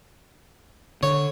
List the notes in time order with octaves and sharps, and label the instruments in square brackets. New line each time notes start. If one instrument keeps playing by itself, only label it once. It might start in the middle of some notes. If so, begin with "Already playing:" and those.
[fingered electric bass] D3 [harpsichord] C#5